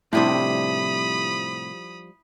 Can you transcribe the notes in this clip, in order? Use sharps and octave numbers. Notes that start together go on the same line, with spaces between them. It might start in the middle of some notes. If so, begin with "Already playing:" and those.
A2 C3 F3 G3 D4 E4 B5 D#6